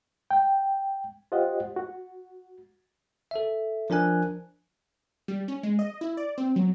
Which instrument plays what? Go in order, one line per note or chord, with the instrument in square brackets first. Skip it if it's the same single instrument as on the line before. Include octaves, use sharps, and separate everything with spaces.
[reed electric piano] G5
F4 G4 C5 D#5 F#5
F#4
[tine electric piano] A4 E5
F3 D4 A#4 G#5 F#6
[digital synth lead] G3
C#4
G#3
D#5
E4
D5
C4
F#3